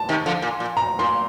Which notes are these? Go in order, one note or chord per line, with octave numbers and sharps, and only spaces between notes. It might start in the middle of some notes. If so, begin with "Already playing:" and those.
Already playing: A5
C3 D#3
D3 F3
A#2
A#2
A#5
A#2 C6